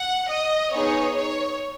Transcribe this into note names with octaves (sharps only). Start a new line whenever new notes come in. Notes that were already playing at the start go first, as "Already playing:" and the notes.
Already playing: F#5
D#5
B3 D#4 G#4 C#5
C#5